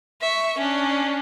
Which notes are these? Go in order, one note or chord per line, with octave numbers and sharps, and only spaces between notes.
E5 C#6
C#4 D4